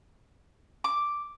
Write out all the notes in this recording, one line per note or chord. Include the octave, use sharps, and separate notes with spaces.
D6